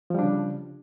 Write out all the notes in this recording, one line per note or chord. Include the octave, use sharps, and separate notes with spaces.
C#3 F3 G3 D4